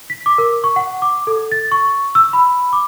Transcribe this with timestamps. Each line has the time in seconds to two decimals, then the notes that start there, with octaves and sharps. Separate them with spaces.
0.10 B6
0.26 D6
0.38 A#4
0.64 C#6
0.76 F#5
1.02 D6
1.27 A4
1.52 A6
1.72 C#6
2.15 E6
2.33 B5
2.73 D6